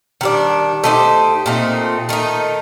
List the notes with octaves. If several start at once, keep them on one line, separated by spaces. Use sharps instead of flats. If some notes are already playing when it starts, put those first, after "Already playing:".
D#3 G3 D4
A3 D#4 G4 C5
A#2 A3 C4 D#4
D#3 A3 D#4